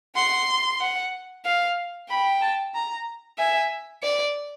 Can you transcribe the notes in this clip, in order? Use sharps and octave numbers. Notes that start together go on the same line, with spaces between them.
F#5 C6
F#5
F5
G5 B5
A5
A#5
E5 G#5
D5